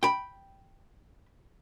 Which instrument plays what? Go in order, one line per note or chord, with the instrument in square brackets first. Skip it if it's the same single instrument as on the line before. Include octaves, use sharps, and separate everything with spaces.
[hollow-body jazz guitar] G5 B5